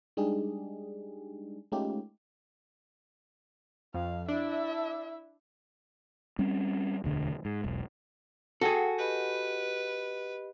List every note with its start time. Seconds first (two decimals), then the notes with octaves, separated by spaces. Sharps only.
0.17 G3 G#3 D4 D#4 G4 G#4
1.72 G#3 A3 C#4 D#4 F4 G4
3.94 F2 F5
4.28 D4 E4 E5
6.39 G3 C4 C#4
7.04 E1 D2 D3
7.45 G#2
7.64 E1 B1
8.61 F#4 G#4 A4 G5
8.98 G4 B4 D#5 B5